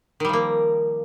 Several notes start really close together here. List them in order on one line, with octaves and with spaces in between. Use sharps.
D#3 G3 F3 A#3